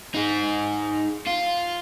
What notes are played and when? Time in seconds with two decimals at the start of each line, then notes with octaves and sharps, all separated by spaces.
0.14 D#4 G#4
1.27 F4